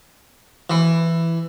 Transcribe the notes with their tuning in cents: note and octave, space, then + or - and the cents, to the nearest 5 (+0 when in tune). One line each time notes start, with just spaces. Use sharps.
E3 +10